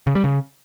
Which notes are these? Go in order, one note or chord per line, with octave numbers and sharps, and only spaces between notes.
C#3
G3
C#3